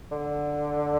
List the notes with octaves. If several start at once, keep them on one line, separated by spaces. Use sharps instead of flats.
D3